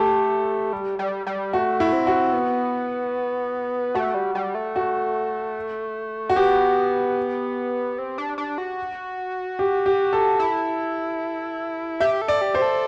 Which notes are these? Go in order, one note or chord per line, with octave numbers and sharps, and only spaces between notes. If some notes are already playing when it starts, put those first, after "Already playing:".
Already playing: A3 G4 A4
G3
G3
G3
A3 F#4
E4
C4
F#4
B3
A3 F#4
G3
G3
A3
F#4
F#4
B3 G4
C4
D4
D4
F#4
G4
G4
A4
E4
G4 E5
A4
D5
G4
C5
A4